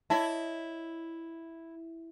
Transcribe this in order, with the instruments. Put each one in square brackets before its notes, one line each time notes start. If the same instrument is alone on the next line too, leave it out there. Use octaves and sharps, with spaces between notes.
[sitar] E4 [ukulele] C#5 D#5 A5